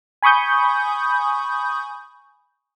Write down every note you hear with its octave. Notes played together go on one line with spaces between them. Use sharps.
G#5 B5 C#6 D#6 G6